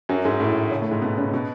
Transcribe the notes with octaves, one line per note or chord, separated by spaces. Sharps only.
F#2 F#3
G#2 G#3
A2 A3
C#3 C#4
A2 A3
G#2 G#3
B2 B3
C#3 C#4
B2 B3